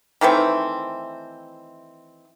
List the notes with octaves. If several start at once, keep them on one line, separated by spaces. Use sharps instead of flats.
D#3 E3 A3 C4